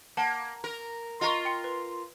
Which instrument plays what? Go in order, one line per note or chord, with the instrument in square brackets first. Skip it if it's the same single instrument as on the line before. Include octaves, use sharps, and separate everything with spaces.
[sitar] A#3 [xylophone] F#5 A5
[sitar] A#4
[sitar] F4 A#4 [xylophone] D#5 A#5 C#6
[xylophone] G5 C#7
B4